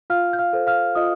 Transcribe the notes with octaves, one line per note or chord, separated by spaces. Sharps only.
F4 F5 F6
G6
F5 F6
A4 C5
F5 F6
F4 D#5 D#6